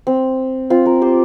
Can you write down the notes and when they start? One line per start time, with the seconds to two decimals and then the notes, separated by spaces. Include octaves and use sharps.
0.07 C4
0.70 C4 F4
0.85 F4 A#4
1.02 G4 C5